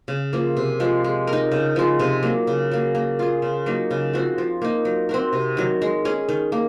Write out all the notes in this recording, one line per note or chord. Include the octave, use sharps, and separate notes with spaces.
C#3
F3 A#3
C3
F3 G#3
G#3
A#4
D#4
C#3
F3 G#3
C3
F#3 A#3
C#3
F#3 A#3
A#3
F4 G#4
C#3
F#3 A#3 D#4
C#3
F3 C4 F#4
F3
A#3 D#4
F#3
C4 F#4 A#4
C3
D#3 F#3
G#3
C#4 G#4
D#3
A#3